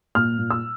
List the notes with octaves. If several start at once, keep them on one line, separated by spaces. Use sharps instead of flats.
A#2 F6
A#2
E6